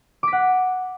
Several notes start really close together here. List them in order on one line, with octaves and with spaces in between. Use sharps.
D6 B6 F#5